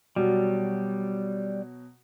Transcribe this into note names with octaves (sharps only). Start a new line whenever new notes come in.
B2 F#3 G3